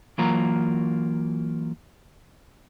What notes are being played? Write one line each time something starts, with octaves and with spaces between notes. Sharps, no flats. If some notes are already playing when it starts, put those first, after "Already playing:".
E3 F#3 A#3 F4 A#5